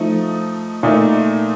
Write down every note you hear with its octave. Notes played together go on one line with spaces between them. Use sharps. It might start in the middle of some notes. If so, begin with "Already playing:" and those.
Already playing: F3 A3 D#4
A#2 A3 D#4